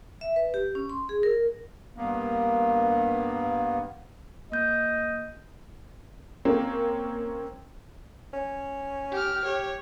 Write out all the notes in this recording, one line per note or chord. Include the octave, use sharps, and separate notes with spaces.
E5
B4
G4
C#4
C6
G#4
A#4
G2 A#3 B3
A#3 D#5 G6
A#3 C4 C#4
C#4
G4 F6
G4 C#5